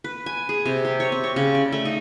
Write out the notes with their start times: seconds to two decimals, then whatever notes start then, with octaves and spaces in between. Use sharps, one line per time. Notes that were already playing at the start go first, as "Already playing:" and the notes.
0.04 B4
0.26 G#5
0.49 G#4
0.66 C3
0.85 G4
1.00 C#5
1.12 C4
1.24 C#5
1.36 C#3
1.55 D5
1.72 A3
1.85 D#4